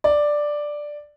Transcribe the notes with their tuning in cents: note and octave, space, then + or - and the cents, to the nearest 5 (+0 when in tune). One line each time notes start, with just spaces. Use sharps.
D5 +5